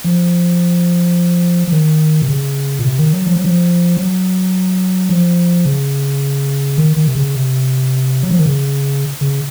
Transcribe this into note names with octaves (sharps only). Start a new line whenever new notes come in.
F3
F3
D#3
C3
C#3
A#2
C3
D#3
F#3
F3
F#3
F3
F#3
F3
C#3
D#3
D#3
C3
C#3
C3
F#3
F3
D#3
C#3
C#3